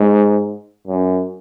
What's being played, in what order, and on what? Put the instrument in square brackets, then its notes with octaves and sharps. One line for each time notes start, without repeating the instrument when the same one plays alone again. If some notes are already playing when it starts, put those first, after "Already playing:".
Already playing: [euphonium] G#2
F#2